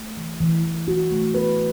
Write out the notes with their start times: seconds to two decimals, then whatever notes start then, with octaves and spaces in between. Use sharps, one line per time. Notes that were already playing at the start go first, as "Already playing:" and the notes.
Already playing: A3
0.17 E3
0.41 E3
0.64 E3
0.88 F#4
1.11 A3
1.34 B4